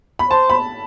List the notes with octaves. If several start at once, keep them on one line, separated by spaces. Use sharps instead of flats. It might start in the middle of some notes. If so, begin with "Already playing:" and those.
B5
C5 A5
B5